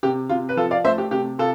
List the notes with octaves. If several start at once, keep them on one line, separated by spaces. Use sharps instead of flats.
C3 G4
C3 F4
B4
F3 F4 A4
D5 F5
A3 C5 E5
G4
C3 G4
C3 F4 A4